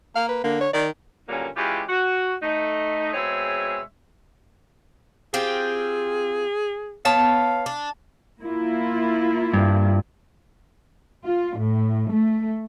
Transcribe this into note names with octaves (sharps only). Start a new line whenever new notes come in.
A#3 F5
B4
D3 A#3
C#5
D#3 D5
G2 A#2 D3 F#3 A#3 C#4
E3 G#3 C#4 F4 G4
F#4
A3 D#4
B2 G#3 C4 G#4 C#5 E5
C4 F4 G4 G#4
B3 C#5 F5 A5
D4
A#3 E4 F4
G2
F4
A2
A3